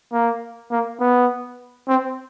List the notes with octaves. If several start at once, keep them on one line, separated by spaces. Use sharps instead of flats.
A#3
A#3
B3
C4